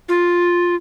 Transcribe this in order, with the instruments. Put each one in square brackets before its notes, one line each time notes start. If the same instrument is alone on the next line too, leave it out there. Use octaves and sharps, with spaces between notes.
[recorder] F4